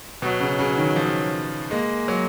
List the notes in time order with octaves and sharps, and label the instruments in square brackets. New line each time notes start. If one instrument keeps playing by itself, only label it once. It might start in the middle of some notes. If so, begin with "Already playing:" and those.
[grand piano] B2 [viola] F#3
[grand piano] C#3
C#3
D#3
F3
[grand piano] G#3 [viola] A#3
[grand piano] F#3